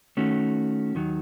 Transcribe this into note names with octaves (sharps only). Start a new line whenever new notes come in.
D#3 A3 C#4 F#4
D#2 D#3 F#3